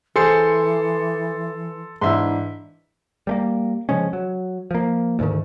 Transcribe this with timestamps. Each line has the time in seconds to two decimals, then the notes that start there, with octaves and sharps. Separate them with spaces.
0.16 E3 G#4 A4 C5 C6 C#7
2.01 G#2 E3 D4 E4 E5 C6
3.27 G3 A3 A#3
3.89 C#3 F3 G#3 C#4
4.13 F#3
4.71 F3 A#3
5.19 D2 G#2 D#3